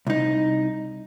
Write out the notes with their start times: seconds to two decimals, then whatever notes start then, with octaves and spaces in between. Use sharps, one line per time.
0.07 C2 D#4